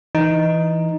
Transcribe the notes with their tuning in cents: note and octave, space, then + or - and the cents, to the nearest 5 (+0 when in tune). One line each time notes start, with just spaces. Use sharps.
E3 +0 D#4 +0